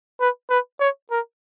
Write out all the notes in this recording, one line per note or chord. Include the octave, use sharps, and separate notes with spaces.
B4
B4
C#5
A#4